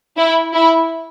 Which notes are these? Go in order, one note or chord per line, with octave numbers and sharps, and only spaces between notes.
E4
E4